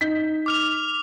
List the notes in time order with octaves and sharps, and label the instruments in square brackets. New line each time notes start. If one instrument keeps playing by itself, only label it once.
[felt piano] D#4 G6 B6
[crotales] D6 F6 F7